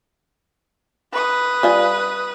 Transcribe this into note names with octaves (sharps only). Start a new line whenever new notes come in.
B4 D#6
G3 F4 G#5